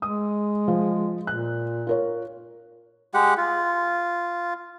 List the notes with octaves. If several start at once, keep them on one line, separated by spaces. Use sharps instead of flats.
G#3 D#6
F3
A#2 F#6
F4 A#4 C#5
G#3 G4 F#5
F4